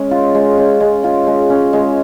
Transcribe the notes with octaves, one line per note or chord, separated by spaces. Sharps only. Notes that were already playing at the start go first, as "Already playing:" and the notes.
Already playing: G#3 C#4
F4
G#3
C#4
G#3
F4
G#3
C#4
G#3